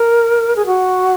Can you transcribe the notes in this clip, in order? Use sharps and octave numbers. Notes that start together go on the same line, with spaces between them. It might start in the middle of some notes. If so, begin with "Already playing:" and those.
Already playing: A#4
G#4
F#4